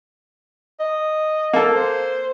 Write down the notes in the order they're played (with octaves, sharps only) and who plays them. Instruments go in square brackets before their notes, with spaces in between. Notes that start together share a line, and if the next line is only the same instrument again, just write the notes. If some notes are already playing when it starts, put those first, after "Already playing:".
[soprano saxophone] D#5
[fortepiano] A#3 A4
[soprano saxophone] C5